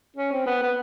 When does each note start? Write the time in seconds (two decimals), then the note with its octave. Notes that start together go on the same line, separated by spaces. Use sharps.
0.16 C#4
0.32 C4
0.46 B3
0.62 B3